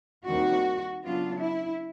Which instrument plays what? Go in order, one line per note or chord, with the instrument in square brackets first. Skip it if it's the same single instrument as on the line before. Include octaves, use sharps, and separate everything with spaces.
[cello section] D#2 D#3 G3 C4 F#4
C#3 F#3 B3 D4 F4
E4